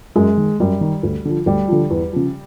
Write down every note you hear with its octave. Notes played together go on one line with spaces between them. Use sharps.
F#2 G#3
D#3
F#2 G3
D#3
D2
D3 F3
D2 G3
D3 F3
E2
C#3 F3